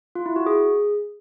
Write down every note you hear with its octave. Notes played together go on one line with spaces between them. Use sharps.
F4
E4
F#4
G#4